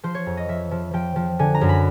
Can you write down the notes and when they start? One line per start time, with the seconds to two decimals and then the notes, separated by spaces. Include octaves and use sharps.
0.03 F3 C5
0.15 C#5
0.26 F2
0.37 D#5
0.48 F3 E5
0.71 F3
0.93 F3 G5
1.16 F3
1.39 D3 G#5
1.55 A#5
1.61 F#2
1.69 B5